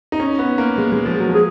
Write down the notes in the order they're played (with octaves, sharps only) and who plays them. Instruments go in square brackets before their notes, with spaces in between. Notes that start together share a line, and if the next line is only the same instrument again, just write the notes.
[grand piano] D#4
C#4
B3
A#3
G#3
G#3
F3
F#3
F3
[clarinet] G#4